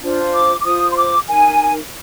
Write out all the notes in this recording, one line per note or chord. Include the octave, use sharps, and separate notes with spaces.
D4 F4 C5
D6
D6
F4 C5 D#6
C6
D6
D#4 A#4 G#5